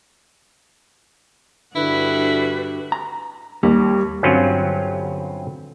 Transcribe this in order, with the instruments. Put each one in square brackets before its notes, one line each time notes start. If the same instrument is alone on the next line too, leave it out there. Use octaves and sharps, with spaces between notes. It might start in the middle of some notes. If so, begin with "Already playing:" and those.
[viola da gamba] G2 G3 F#4 [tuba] D3 [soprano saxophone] E4 [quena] B4
[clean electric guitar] A#5
[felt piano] D#2 [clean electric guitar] G3
[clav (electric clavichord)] G1 G2 F#3 C4 C#4 F4